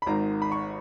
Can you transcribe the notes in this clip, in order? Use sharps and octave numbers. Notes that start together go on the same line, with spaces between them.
B5
G#1 G#2 D#3 A#5
B5
C#6